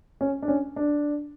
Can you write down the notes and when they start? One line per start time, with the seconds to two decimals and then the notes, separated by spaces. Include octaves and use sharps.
0.21 C#4
0.43 D4
0.48 C#4
0.76 D4